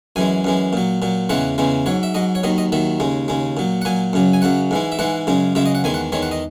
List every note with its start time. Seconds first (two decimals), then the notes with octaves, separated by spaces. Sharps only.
0.16 F#2 E3 G#3 G#5
0.44 F#2 E3 G#3
0.73 A#2 F#3
1.02 A#2 F#3
1.29 E2 C#3 E3 G#3 F#5
1.58 E2 C#3 E3 G#3
1.86 G#2 F#3 C#5
2.03 E5
2.14 G#2 F#3 D#5
2.35 C#5
2.44 D#2 D#3 F#3 D#5
2.58 D#5
2.72 D#2 D#3 F#3 E5
3.00 D#2 C#3 G#3
3.28 D#2 C#3 G#3
3.57 A#2 F#3
3.82 F#5
3.85 A#2 F#3 G#5
4.13 F#2 C#3 F#3
4.33 G#5
4.42 F#2 C#3 F#3 F#5
4.71 G#2 E3 G#3
4.92 E5
4.99 G#2 E3 G#3 F#5
5.27 F#2 C#3 G#3
5.55 F#2 C#3 G#3 E5
5.66 D#5
5.75 F#5
5.84 E2 D#3 G#3 G#5
5.94 F#5
6.12 E2 D#3 G#3 C#5
6.22 F#5
6.31 D#5